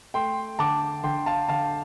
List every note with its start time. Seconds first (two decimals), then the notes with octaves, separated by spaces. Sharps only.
0.14 A3 G5 C6
0.59 D3 A5 D6
1.04 D3 G5 C6
1.26 F5 A5
1.48 D3 F5 A5